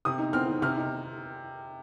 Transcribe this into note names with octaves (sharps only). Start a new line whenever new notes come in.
C3 D#6
D#4
C4 F6
D#3
C3 F6
D#4